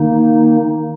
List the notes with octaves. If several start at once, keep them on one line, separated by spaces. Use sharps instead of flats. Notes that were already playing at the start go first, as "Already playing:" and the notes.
Already playing: D#3 A#3 D#4